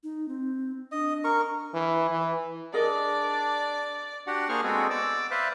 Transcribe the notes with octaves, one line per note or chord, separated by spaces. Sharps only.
D#4
C4
D4 D#5
A#4 C#6
E3
E3
D4 G#4 A#4 D5 D#5
D4 F#4 G4 F#5
A#3 D4 G#4 C5 C#6 F6
G#3 B3 C4 F#4 G#4 A4
D5 D6 E6
B4 C5 D5 E5 F5